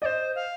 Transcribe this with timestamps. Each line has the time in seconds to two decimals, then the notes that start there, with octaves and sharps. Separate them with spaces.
0.02 D5 D#5
0.06 C5
0.35 F5